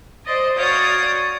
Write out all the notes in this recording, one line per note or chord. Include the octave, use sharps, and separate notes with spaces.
C5 D5 D#5
F#4 C#5 D5 F5 D#6 G6